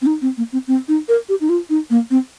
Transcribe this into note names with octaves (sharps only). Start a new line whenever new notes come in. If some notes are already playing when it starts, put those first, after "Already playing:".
C4
D#4
C4
A#3
C4
C4
D#4
A#4
G4
D#4
F4
D#4
A#3
C4